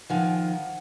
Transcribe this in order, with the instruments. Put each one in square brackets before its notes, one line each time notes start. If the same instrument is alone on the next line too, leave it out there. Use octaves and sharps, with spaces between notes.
[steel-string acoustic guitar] D#3 F3 [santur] F5 F#5 G#5